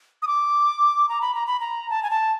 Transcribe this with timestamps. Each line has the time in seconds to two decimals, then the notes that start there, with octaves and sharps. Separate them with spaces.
0.22 D#6
0.27 D6
1.09 A#5
1.21 B5
1.35 A#5
1.47 B5
1.60 A#5
1.90 A5
2.03 G#5
2.10 A5